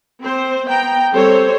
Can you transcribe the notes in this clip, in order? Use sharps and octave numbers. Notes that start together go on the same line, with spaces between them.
C4 C5
B3 G5 A#5
G3 C4 A4 C5 C#5